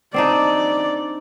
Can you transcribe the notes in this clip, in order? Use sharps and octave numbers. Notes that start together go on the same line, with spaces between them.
C4 D4 D#4 D5